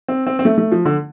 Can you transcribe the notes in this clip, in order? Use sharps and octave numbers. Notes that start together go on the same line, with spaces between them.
C4
C4
C4
A3
A3
F3
D3